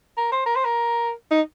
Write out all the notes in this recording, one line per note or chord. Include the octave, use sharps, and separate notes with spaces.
A#4
C5
A#4
C5
A#4
D#4